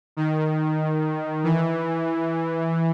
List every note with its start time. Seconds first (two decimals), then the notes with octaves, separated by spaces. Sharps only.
0.17 D#3
1.44 E3